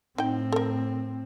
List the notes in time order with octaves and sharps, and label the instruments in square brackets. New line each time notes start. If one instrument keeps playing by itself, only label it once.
[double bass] A2 C4 [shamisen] D#4 G5
[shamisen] A4 A#4